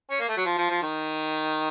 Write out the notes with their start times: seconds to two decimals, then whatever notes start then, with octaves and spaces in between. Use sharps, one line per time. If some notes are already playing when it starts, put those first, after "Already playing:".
0.10 C#4
0.20 A#3
0.29 A3
0.37 F#3
0.46 F3
0.58 F3
0.70 F3
0.83 D#3